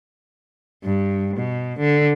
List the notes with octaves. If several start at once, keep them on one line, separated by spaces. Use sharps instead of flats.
G2
B2
D3